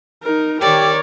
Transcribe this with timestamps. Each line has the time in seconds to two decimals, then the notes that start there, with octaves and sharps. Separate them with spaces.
0.23 D#4 A#4
0.61 D#3 G4 A#4 C#5 D5